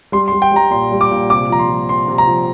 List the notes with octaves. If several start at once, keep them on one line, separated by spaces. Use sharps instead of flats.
G3 C6
C6
G3
G5
G3 A#5
A#2 C6
G3
D6
A#2
C3 D6
F3 A#5
C6
F3
C3 C6
C3
A#5
F3